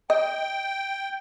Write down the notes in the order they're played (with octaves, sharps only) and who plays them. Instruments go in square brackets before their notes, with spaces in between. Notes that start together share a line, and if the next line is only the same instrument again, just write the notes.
[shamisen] D#5 [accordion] G5